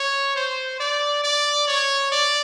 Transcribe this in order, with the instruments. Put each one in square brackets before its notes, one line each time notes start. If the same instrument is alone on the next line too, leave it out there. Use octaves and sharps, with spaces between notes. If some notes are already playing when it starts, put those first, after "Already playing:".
Already playing: [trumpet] C#5
C5
D5
D5
C#5
D5